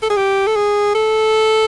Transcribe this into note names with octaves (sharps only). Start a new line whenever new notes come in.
A4
G#4
G4
A4
G#4
A4